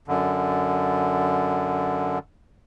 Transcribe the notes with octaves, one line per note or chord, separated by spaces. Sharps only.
F#2 D3